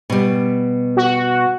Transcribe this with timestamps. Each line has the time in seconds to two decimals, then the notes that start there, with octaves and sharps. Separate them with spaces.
0.10 B2 G3
0.97 F#4